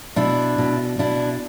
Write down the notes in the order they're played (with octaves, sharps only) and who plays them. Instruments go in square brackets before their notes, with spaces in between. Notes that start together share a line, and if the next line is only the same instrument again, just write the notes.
[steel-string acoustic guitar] B2 D4 E4
B2
B2 D4 E4